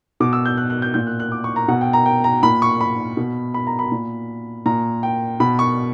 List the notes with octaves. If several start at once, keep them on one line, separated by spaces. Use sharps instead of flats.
B2 D6
E6
G6
F#6
F#6
G6
A#2 G6
F#6
F#6
D6
C#6
A#5
B2 F#5
G5
A#5
G5
A#5
A#2 B5
C#6
B5
B2
B5
A#5
B5
A#2
A#2 A#5
G5
B2 B5
C#6